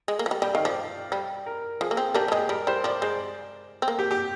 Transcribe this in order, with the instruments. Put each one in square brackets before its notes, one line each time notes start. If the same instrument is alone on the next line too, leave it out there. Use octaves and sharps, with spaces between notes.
[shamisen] G#3
A#3
F3
G3
[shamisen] G3 [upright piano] G5
[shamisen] D#3 [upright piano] F5
[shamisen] F3 [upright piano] D5
[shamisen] G3
[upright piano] A#4
[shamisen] F3 [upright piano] G#4
[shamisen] A#3
C4
[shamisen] A#3 D4 [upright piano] G4
[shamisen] G3
[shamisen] G#3 [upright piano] G#4
[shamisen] G3 [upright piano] A#4
[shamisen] G3 [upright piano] C5
[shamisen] F3 [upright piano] D5
[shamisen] G#3 [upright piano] C5
[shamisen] C4
A#3
[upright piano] G4
G4